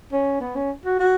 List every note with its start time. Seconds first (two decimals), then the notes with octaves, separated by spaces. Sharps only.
0.12 C#4
0.40 B3
0.56 C#4
0.85 F#4
1.00 F#4